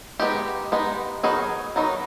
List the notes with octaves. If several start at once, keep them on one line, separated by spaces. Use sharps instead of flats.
G#3 B3 D#4 G4
G#3 B3 D#4
D#3 F#3 B3 D#4 G#4
D#3 F#3 B3 D#4